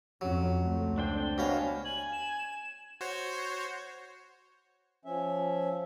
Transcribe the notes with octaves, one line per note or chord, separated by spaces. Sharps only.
F2 F#3 C#4
C#2 A3 C4
D4 C5 G5
B2 C#4 F5
G#5 F#7
E7
F#4 C5 C#5
F3 C#4 E5